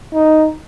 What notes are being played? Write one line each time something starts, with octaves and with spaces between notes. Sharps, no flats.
D#4